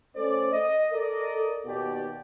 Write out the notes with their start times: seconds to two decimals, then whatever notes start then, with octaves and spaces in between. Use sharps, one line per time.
0.15 A3 C#4 A4 C5 D5
0.53 D#5
0.92 A4 A#4 D5 D#5
1.66 D#2 B2 G4 D5